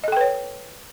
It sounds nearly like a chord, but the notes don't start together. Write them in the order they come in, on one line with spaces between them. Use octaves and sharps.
D#5 A4 G5 B4 C#5